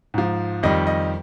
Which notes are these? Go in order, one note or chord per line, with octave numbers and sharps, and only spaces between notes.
G#2 F3
F2 D#3 G3 D#5
D#5